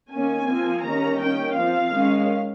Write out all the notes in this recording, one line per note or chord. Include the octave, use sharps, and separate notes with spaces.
D#3 A#3 C#4 G#5
F3 C4
D#3 G3 A#3 C#4 A#5
D#3 A#3 C#4 G5
F3 C4 F5
D#3 G#3 C#4